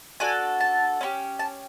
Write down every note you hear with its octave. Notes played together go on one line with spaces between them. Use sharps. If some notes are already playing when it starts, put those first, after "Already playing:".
D4 F#4 A4 G#5
A5
C#4 E4 G4
A5